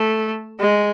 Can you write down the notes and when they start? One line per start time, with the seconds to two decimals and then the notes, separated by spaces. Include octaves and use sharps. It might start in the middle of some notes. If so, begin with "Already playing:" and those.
Already playing: A3
0.61 G#3